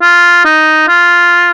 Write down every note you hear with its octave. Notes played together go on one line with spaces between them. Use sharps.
F4
D#4
F4